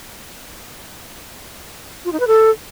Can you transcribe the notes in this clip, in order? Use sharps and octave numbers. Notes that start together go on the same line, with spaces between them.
F4
D#4
B4
A4